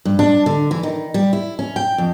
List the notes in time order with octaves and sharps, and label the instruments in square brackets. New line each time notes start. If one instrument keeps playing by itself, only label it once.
[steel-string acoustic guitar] G2
D4
D3
E3
D#3
G3
E4
C#4
G5
F2